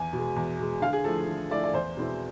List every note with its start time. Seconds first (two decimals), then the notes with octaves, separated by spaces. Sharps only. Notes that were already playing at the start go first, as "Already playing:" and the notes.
Already playing: E2 G#5
0.13 B2
0.18 G#3
0.36 E2
0.59 B2 G#3
0.81 D3 F5
0.93 G#4
1.04 F3 A3 E4 A4
1.27 D3
1.50 F3 A3 E4 D5
1.64 D5
1.73 E2 C5
1.97 B2 G#3 C4 E4